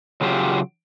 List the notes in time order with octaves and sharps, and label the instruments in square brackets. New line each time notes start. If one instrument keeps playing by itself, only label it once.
[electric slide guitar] C#3 F#3 F4 G4